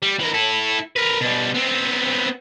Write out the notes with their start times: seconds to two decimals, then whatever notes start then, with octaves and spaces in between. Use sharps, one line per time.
0.02 G3
0.19 E3 A#4
0.34 E4 A4
0.96 A#4 B4
1.21 B2 G3
1.55 B3 C4